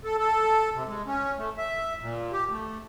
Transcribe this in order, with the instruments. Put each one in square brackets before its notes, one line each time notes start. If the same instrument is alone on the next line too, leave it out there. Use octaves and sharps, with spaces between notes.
[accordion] A4
A4
C3
G#3
C#4
A3
E5
A#2
G4
A3